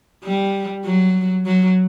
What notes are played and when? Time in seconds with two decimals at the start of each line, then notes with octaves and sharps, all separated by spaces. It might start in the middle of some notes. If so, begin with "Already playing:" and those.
0.24 G3
0.84 F#3
1.46 F#3